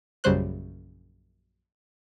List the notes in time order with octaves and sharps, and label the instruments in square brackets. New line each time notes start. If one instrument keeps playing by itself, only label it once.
[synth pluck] A#1 F#2 C#3 G3 C5 F#6